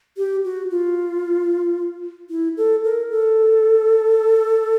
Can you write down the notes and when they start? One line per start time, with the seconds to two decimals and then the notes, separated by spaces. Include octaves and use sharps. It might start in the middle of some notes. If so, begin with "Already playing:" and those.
0.17 G4
0.44 F#4
0.71 F4
2.30 E4
2.57 A4
2.84 A#4
3.11 A4